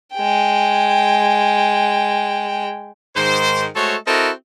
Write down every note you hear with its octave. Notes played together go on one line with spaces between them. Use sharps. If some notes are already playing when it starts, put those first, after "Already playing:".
G#3 G5
G#2 D#3 C5
G#3 A3 F#4 A4 C5 C#5
C4 E4 F#4 A4 A#4 D#5